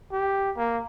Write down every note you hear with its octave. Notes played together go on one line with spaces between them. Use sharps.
G4
A#3